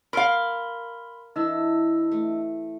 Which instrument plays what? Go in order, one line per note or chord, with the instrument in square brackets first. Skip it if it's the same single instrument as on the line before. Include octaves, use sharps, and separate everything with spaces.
[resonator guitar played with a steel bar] A#4 F5 [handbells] B5 C6
[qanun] E3 E4 [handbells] D4 D#5 E6
[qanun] A3